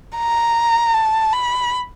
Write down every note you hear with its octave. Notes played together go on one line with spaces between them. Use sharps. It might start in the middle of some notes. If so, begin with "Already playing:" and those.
A#5
A5
B5